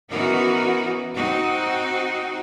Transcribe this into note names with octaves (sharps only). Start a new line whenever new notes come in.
E3 B3 C#4 D#4 F#4 A#4
C4 D#4 F#4